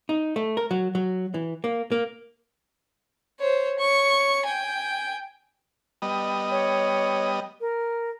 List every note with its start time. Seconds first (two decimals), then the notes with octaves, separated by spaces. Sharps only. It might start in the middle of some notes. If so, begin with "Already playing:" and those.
0.09 D#4
0.36 A3
0.57 A#4
0.71 F#3
0.95 F#3
1.34 E3
1.64 A#3
1.92 A#3
3.40 C5 C#5
3.79 C#5 C#6
4.46 G5 G#5
6.02 G3 B3 D#5
6.51 C#5
7.61 A#4